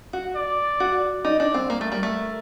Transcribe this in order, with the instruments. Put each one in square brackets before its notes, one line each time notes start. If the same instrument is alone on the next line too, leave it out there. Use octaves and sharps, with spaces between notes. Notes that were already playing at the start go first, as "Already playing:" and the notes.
[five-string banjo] F#4
[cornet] D5
[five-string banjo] F#4
[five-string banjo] D#4 [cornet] D5
[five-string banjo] D4
C4
[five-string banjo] A#3 [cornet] A#4
[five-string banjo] A3
G3
A3